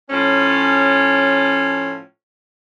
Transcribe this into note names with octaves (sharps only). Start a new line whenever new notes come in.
A2 F3 C#4